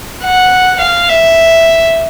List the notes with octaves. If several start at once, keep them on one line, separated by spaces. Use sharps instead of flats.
F#5
F5
E5